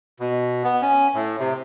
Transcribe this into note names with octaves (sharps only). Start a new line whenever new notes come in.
B2
B3
C#4
A2
C3